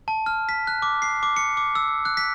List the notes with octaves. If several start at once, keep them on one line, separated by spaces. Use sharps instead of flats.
A5
F6
B6
F#6
D6
C7
D6
C#7
D6
E6
F#6
B6